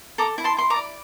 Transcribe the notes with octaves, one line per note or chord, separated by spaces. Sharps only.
A4 A#5 D6
E4
A5 C6
E4 C6
A#5 D6
D5